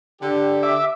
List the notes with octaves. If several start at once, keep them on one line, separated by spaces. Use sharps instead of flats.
D3 G4
E5 D6